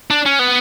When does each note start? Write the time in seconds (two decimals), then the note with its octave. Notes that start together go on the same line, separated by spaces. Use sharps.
0.11 D4
0.26 C#4
0.39 B3